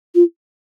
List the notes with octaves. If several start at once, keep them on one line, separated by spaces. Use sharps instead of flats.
F4